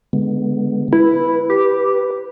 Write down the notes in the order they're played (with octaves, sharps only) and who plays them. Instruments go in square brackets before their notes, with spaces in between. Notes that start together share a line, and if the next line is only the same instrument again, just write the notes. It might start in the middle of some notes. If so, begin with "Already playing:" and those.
[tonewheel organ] D3 G#3 B3
[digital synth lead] E4 [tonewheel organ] B4
[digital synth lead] G4